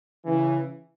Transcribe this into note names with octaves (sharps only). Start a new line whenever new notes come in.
C#3 E3